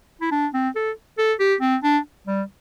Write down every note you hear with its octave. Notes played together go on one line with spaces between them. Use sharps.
E4
D4
C4
A4
A4
G4
C4
D4
G3